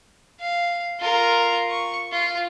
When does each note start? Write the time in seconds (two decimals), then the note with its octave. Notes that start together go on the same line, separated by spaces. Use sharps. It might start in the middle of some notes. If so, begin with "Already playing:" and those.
0.40 F5
1.00 F4 A#4
1.70 C#6
2.12 F4